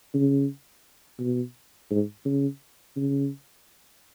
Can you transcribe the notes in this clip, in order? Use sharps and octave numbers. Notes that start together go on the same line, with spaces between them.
C#3
B2
G#2
C#3
C#3